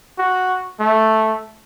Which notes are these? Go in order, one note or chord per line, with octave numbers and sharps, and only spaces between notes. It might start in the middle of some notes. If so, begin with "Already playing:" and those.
F#4
A3